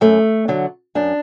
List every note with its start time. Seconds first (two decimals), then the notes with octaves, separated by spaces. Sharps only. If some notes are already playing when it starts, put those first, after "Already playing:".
0.01 F#2 A3
0.48 D3 F#3
0.95 F#2 D4